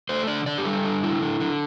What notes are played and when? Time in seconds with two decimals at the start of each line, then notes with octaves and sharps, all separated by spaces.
0.09 A3 C5
0.27 D3 D5
0.46 D3 D5
0.58 G4
0.65 G3 A4
0.85 D3
1.03 E4
1.22 D3
1.40 D3